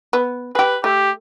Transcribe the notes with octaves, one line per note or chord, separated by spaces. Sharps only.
B3
G4 G#4 B4
A3 G4